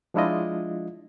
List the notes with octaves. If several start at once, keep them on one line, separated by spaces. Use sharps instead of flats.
F3 G#3 D4 E4 F4 D#5